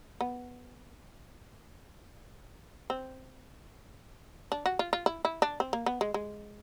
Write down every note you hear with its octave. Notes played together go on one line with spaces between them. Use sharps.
B3
C4
D4
F#4
F4
F4
E4
E4
D4
C4
A#3
B3
G#3
G#3